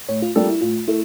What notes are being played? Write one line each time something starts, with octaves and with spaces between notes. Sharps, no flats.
A2 C#5
F4
G3 A#3 D4 F4 A4
E4
A2 F4
A3 E4